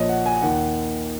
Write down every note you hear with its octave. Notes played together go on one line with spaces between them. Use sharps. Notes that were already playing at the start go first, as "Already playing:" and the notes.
Already playing: A#1 A#2 F3 C#5 D#5
F#5
G#5
D#2 D#3 F#5